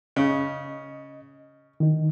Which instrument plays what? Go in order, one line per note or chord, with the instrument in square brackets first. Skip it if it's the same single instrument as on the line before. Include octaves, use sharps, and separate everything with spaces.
[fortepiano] C#3 [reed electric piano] D#5
[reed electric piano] D#3 D#4